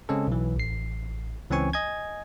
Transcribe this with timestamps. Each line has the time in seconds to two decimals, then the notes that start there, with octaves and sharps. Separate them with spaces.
0.09 C#3 G#3 C4 C#4 A4
0.27 B1 E3
0.56 A1 C7
1.50 C#2 E3 C4 C#4 G#5 C#6
1.73 D#5 G#5 G#6